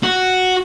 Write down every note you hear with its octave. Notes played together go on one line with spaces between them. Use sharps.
F#4